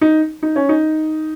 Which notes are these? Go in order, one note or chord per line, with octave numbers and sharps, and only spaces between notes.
D#4
D#4
C#4
D#4